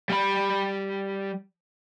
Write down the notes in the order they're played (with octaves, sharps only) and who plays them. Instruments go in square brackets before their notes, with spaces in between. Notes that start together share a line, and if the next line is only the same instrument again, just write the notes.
[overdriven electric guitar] G3 B5